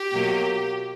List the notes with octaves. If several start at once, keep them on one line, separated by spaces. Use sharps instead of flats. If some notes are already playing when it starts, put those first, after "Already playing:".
Already playing: G4
B2 F#3 A#3